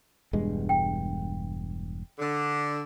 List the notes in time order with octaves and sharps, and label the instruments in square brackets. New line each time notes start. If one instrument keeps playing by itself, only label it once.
[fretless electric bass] E1 G2 G#3
[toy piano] G5
[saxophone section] D3